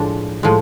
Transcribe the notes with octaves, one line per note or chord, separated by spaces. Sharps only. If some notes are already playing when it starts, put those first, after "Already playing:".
Already playing: A2 F3 G#3 D4
A2 F3 G#3